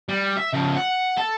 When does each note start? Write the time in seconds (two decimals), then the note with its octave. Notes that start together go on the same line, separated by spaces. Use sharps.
0.09 G3
0.37 E5
0.54 C#3 F3
0.76 F#5
1.18 A4